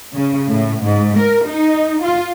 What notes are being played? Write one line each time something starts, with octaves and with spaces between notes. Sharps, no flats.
C#3
A2
G#2
A#4
D#4
F4